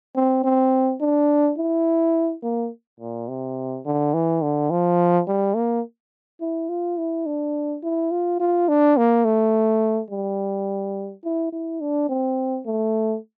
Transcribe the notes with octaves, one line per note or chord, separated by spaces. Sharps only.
C4
C4
D4
E4
A#3
A#2
C3
D3
E3
D3
F3
G3
A#3
E4
F4
E4
D4
E4
F4
F4
D4
A#3
A3
G3
E4
E4
D4
C4
A3